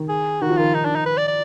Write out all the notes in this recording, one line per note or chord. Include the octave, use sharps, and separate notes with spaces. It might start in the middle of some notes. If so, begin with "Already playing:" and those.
Already playing: D#3
G#4
D#3 F#4
F3
D#3 F4
D#4
D4
D#4
B4
D5
D5